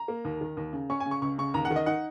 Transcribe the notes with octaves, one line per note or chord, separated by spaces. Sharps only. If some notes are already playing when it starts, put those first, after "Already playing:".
Already playing: A#5
A#3
D#2
D#3
D#2
C#3
C#4 C#6
G#5
C#3
C#6
C#2 C#6
C#3 C#6
D#2 A#5
F#5
D#3
D#5
D#4 F#5